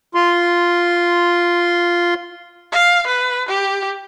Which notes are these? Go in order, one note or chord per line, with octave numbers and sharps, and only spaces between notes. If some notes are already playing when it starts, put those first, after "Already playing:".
F4 C6
F5
B4
G4